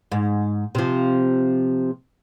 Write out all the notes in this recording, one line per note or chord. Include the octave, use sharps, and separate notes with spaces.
G#2
C3 F3